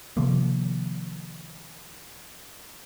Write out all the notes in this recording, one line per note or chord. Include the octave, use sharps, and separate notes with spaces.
C3 D#3 F3 A#3